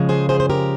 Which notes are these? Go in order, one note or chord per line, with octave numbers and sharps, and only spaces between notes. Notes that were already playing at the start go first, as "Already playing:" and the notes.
Already playing: C#3 F3 G#3
G#4 C5
G#4 C5
C5
G4 A#4